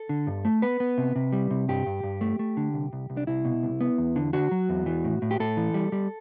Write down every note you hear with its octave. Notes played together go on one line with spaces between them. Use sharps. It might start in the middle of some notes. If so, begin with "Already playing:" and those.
Already playing: A4
D3
G2
A3
B3 B4
B3
C3
C3
G3
C3
G2 G4
G2
G2
A3
A3
D3
C2
C2
C2
D4
C2 E4
B2
C2
B3
E2
D3
D3 F#4
F#3
E2
E3
A2
A2
G4
A2 A4
E3
G3
G3